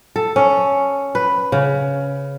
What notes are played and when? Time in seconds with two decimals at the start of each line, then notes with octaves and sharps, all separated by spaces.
0.16 A4
0.36 C#4
1.15 B4
1.52 C#3